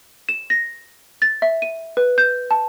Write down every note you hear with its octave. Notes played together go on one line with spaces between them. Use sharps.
E7
A#6
A6
E5
D#7
B4
G6
A5